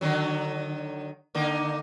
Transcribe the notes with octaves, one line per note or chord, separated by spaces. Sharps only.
D3 D#3 F#3
D3 A#3 D#4